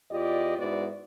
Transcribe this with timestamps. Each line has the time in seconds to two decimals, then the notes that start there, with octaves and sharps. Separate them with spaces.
0.11 E2 F4 G4 D5 D#5
0.58 G#2 B3 E4 F#4 D5